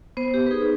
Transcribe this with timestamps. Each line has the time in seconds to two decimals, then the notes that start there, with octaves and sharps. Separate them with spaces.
0.17 B3 C5
0.34 G4
0.47 B4
0.51 D#4 G#4